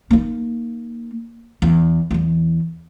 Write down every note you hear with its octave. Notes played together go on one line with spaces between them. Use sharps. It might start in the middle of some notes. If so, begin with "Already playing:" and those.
A#3 D#4
E2
E2 E3